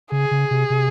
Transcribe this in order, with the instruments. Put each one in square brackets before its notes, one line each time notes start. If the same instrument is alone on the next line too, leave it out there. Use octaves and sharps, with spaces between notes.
[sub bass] C#3 [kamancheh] G#4
[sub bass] C#3
C3
C3